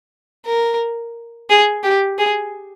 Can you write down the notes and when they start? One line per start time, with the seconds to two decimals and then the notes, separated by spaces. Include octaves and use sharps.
0.46 A#4
1.50 G#4
1.83 G4
2.18 G#4